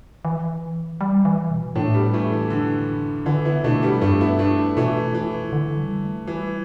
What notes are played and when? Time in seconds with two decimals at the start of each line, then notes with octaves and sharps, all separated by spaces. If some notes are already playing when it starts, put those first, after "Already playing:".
0.25 E3
1.01 G3
1.25 E3
1.51 B2
1.75 A2 A3 D4
1.94 G3 B3
2.13 E3 A3
2.32 E3
2.50 D3
3.26 D3 E3
3.45 B3 E4
3.64 B2 A3 D4
3.82 G3 B3
4.01 G2 A3 D4
4.21 B3 E4
4.39 A3 D4
4.77 B2 E3 A3
5.14 E3
5.53 D3
5.77 G3
6.03 A3
6.27 E3 G3